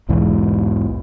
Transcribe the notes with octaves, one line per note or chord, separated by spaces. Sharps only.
B1 E2 G#2 E3